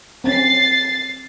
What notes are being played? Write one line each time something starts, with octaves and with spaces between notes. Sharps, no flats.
C4 C#4 A6 C7